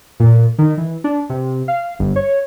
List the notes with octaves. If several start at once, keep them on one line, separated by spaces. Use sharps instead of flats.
A#2
D#3
E3
D4
C3
F5
G1
C#5